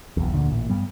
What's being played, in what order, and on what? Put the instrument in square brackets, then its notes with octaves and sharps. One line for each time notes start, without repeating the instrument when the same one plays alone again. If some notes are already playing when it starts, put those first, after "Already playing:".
[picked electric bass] E1 B1 E2
D2 A#2 D3
A1 A#2
G2 G3 B3